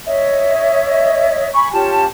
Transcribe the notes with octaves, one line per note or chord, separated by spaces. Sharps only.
C#5 D#5 E5
G#5 B5 C#6
C#4 F4 G4 A5